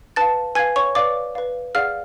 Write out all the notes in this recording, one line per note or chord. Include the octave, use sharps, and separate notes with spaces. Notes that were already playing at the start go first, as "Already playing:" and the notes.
B4 F5 A5 A6
B4 F5 G#5 G#6
C#5 C#6
B4 D5 F5 D6
B4 F5
G#4 D5 F5 F#5 F6